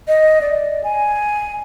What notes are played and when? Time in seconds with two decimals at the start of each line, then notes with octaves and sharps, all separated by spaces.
0.08 D#5
0.41 D5
0.84 G#5